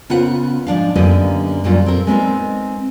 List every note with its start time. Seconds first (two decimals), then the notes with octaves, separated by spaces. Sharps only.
0.10 C#3 B3 F4 A#4 C5 F#5
0.67 G#2 F3 D4 F5
0.96 F#2 D3 A#3 B3 G4 D#5
1.64 F#2 A#2 G3 A#3 F4 F#4
1.86 C4 A4 A#4
2.07 G#3 B3 C4 D4 D#4 A#4